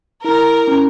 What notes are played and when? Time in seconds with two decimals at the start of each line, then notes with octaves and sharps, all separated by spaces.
0.24 E4 A#4
0.67 C#4